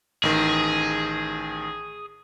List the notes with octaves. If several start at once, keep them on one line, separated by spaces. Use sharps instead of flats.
A1 D#3 G#4